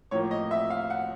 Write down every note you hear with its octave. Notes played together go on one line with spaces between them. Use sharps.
A2 F3 A#3 C#5
D#5
E5
F5
F#5